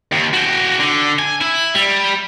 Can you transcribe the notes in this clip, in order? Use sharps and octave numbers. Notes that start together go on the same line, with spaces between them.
D#2
F#4 G5
D3
G#5
E4
G3